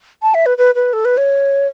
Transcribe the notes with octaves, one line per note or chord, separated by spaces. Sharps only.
A5
E5
B4
B4
B4
A4
B4
C#5